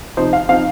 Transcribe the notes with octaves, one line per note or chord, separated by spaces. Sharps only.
C3 F3 D#4 C5
F5
F3 C4 D#4 F5